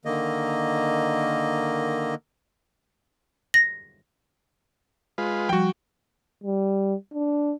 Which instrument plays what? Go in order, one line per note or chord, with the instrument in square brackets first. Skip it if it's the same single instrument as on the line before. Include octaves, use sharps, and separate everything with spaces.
[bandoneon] D3 D#3 A#3 D#5
[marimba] A#6
[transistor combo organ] G#3 F4 B4
[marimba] F3 G3 [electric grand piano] F#4 G5
[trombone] G3
D4